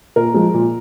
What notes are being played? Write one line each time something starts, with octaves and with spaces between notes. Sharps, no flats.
A#2 A#4
F3 G#3
A#2